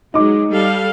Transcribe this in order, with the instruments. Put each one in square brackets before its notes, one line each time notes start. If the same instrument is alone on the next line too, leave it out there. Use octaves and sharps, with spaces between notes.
[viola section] F#3 G#3 [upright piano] D#4 D6
[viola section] G3 A4 F5